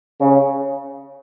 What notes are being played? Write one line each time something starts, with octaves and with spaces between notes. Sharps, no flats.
C#3